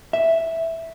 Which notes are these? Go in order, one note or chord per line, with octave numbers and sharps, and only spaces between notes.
E5